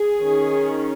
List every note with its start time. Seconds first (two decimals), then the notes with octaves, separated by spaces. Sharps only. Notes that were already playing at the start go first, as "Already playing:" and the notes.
Already playing: G#4
0.19 D#3 C#4